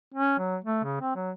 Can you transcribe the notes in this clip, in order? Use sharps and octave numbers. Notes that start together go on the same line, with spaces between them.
C#4
F#3
A3
C#3
C4
F#3